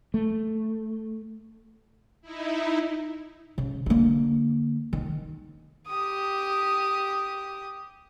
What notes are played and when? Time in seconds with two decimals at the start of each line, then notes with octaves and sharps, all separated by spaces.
0.14 A3
2.22 D#4 E4
3.58 C#3
3.86 D3 A#3
4.93 D#3
5.88 G4 D#6